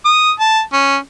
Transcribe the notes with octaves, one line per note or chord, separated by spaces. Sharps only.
D#6
A5
C#4